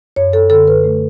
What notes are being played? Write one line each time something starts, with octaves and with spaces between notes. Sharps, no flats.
F#2 C#5
A4
D3 A4
B4
A3